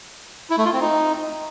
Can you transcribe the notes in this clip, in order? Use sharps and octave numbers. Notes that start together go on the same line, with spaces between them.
E4
A3
F4
C4
D#4